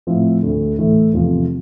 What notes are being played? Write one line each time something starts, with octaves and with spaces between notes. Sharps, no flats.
A2 F3 C4 E4
D2 D3 A3
A2 E3 A3 E4
E2 C3 F3 A3 C4